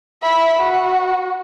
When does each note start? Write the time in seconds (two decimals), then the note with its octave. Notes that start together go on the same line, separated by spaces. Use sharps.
0.23 E5 B5
0.59 F#4